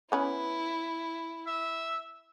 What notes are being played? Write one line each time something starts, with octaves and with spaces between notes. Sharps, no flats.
B3 C#4 E4 B4
E5